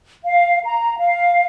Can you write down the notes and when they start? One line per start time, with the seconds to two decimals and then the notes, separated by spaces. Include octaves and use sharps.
0.24 F5
0.64 A#5
0.98 F5